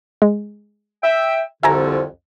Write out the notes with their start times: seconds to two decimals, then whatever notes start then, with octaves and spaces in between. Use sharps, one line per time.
0.22 G#3
1.04 E5 G5
1.63 C2 F2 D3 E5 G#5 A#5